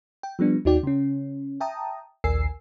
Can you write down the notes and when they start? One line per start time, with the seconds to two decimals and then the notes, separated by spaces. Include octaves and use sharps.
0.23 G5
0.39 F3 G3 B3 D4
0.65 D#2 D#4 F#4 D5 G5
0.83 C#3 C#4
1.60 E5 G5 A5 A#5 D#6
2.24 A#1 D#2 A#4 G#5 E6 C7